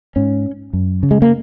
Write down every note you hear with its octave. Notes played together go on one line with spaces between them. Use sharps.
G#2 C#4
F#2
C#3
G#3
A#3